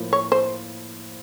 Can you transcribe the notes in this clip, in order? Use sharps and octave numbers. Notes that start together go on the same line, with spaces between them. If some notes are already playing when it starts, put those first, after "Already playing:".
Already playing: A2 F3 A#3 F4
C#5
C5